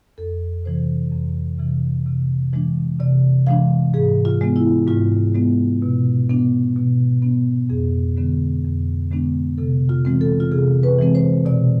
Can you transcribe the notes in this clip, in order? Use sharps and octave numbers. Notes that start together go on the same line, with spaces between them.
F2 A4
C3 E3 C5
F2
C3 E3
C3
E3 G#3 D4
C3 D5
E3 G#3 D4 F5
G#2 G#4
F4
G#3 B3
E4
G#2 F4
G#3 B3
B2
B3 D4
B2
B3 D4
F2 G#4
D3 G#3 B3 D4
F2
D3 G#3 B3 D4
C3 A4
F4
E3 G#3 C4
A4
F4
C3 G#4
B4
E3 G#3 C4
C5
B2 D5